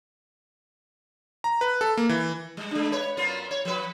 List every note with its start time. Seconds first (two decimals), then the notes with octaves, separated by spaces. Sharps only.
1.44 A#5
1.61 B4
1.81 A4
1.97 A#3
2.09 E3
2.57 G3
2.71 G#3 D4
2.92 B4 C#5
3.17 F#2 B3 F4
3.51 C#5
3.65 F3 B4